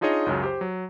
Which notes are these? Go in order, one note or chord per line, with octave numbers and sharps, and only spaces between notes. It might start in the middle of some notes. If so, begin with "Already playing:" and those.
D4 D#4 F4 G#4 C#5 D#5
C#2 F#2 C#3 F#3
G4 C5
F#3